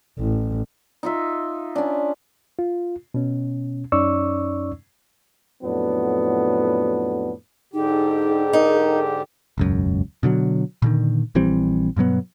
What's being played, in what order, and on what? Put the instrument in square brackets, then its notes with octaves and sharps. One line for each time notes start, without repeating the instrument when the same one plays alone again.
[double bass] A1
[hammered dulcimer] D#4 F4 E5
C#4 D4
[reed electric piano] F4
B2 C#4
F#2 C#4 D#4 D5 C#6 E6
[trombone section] F2 A2 F#3 B3 D4
[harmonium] G#2 D3 G4 [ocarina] D#4 [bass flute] G#4
[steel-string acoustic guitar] D#4 [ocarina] A#4
[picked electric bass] E1 C#2 F#2
B2 D3 F3 F#3
A#2 D3 D#3
A#1 E3 G3 C4
G2 B2 F#3 B3